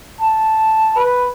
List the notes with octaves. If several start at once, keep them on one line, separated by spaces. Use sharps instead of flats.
A5
B4